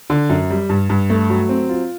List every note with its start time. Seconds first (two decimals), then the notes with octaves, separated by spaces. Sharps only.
0.10 D3
0.29 F#2
0.50 G3
0.69 G2
0.90 G2
1.10 A3
1.30 F#3
1.49 C4
1.69 F4